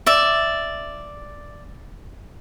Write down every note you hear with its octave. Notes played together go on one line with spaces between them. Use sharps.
D5 E5